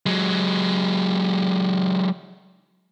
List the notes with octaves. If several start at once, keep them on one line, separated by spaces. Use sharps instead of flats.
F#3 G#3